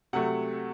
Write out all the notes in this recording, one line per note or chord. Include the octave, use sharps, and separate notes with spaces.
C3 F#3 A3 F#5